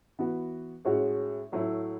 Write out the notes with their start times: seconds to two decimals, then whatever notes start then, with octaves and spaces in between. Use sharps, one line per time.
0.19 E3 B3 F#4
0.85 A2 G#3 C#4 F#4
1.52 A2 F#3 A3 E4